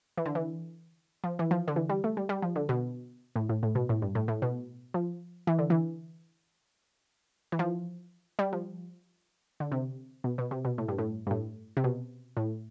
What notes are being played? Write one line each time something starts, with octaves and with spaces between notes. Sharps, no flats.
E3
D3
E3
F3
E3
F3
D3
E3
G3
A3
G3
G3
F3
D3
B2
A2
A2
A2
B2
A2
G2
A2
A2
B2
F3
E3
D3
E3
E3
F3
G3
F3
D3
C3
B2
B2
C3
B2
A2
G2
A2
G2
A2
C3
B2
A2